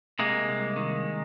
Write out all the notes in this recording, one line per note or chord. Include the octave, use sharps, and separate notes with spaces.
C3 G#3 A#3
C2
D#3